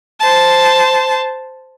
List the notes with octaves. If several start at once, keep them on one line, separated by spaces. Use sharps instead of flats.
C5 A5